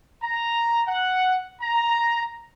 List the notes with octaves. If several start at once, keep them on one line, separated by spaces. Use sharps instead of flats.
A#5
F#5
A#5